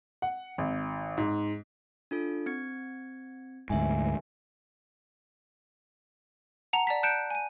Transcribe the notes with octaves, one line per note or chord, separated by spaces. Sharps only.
F#5
G#1
G#2
D4 F4 A4
C4 G#6 C#7
D2 G#2 E5 G#5
F#5 A5 A#5 F7
D5 A5 B6
A5 F#6 G6 C#7 D7 E7
G#5 D#7